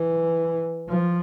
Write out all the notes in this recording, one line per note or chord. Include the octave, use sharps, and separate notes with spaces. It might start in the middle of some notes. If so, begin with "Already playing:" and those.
Already playing: E3
F3